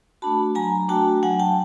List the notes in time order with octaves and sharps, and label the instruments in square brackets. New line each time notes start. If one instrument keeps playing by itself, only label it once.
[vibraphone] A3 D4 F#4 A5 B5
F#3 G#5 A#5
A3 D4 F#4 G5 A5
F#3 F#5 G#5
G5 A5